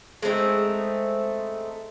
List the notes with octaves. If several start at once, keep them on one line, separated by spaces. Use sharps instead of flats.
G#3 A3 C4 D#4